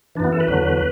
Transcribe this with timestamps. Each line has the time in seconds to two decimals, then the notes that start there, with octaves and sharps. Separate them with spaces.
0.15 E3 D4
0.20 F#2 B3
0.33 A4
0.40 B4
0.48 E2 D3 F#3